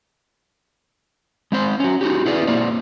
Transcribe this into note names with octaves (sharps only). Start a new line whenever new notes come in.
G#3 C4 C5
C#4 F#4
D#4 F#4 G4
E4 G#4 B4 D5
A#3 C4 D5